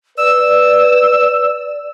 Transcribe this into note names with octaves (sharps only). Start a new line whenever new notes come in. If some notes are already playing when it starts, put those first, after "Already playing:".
B4 D5 E6